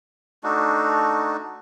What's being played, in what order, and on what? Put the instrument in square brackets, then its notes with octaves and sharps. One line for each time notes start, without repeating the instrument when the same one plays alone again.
[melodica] A3 D4 D#4 F#4